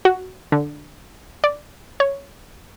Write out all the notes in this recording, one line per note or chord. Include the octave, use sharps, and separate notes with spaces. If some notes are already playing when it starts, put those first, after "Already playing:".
F#4
D3
D5
C#5